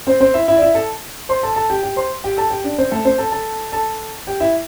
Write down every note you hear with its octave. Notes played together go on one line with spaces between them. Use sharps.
C4 C5
C4 C5
E4 E5
E4 E5
D5
E4 E5
A4 A5
C5 C6
A4 A5
A4 A5
G4 G5
G4 G5
C5 C6
G4 G5
A4 A5
G4 G5
D4 D5
C4 C5
A3 A4
C4 C5
A4 A5
A4 A5
A4 A5
G4 G5
E4 E5